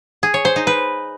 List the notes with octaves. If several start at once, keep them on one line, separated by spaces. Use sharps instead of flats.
G#4
C#5
C5
D#4
B4